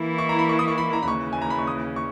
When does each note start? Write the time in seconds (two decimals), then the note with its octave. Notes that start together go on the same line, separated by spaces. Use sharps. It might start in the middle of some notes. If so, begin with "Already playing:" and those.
Already playing: E3 A#3 E4
0.18 C#6
0.29 A#5
0.39 B5
0.49 C#6
0.59 D#6
0.68 C#6
0.78 B5
0.93 A#5
1.03 B5
1.08 D#2 C#3 E3 C#6
1.33 G#5
1.42 A#5
1.50 B5
1.59 C#6
1.67 D#6
1.96 C#6